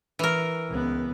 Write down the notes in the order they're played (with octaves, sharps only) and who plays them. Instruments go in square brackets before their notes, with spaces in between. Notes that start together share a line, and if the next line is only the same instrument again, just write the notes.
[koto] E3 A#4
[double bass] C#2 B3